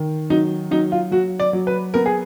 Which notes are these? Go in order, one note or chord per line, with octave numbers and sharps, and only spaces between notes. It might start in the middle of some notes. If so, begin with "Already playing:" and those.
Already playing: D#3
F#3 D#4
F#3 D#4
F4
F#3 F#4
D5
F#3
B4
B3 A#4
G#4